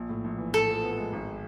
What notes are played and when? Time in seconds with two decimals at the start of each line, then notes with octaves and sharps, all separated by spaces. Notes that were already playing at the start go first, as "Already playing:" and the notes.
Already playing: A#1
0.09 A2
0.24 A#1
0.38 E3
0.54 A2 A4
0.69 F3
0.83 B3
0.98 G#3
1.13 G#1